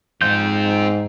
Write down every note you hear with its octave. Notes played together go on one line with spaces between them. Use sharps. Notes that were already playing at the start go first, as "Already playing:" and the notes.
G#2 C4 F4 G6